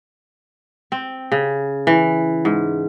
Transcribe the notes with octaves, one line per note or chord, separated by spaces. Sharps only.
C4
C#3
E3
G#2